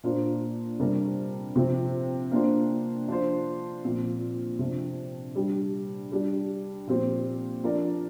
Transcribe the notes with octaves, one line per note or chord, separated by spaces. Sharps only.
A#2 A#3 D4 F4 C5
C3 G3 D4 G4 A#4
C3 F3 C4
A#3 D4 F4 C5
F3 D4 F4 C5
A#2 F3 C4
C3 F3 D4
G3 D4 G4
G3 D4 G4
A#2 F3 C4 G4 C5
F3 D4 A#4 D5